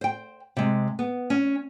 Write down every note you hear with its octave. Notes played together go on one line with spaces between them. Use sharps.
C5 G5
C3 G#3
B3
C#4